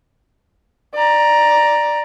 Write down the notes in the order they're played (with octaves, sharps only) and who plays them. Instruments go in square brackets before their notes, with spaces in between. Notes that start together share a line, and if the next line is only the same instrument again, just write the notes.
[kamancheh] D5 A#5